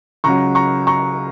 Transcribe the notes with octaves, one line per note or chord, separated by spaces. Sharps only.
C#2 C#3 F#3 A#5 C#6
A#5 C#6
A#5 C#6